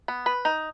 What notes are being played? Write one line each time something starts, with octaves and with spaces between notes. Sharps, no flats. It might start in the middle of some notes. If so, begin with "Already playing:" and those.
B3
B4
D#4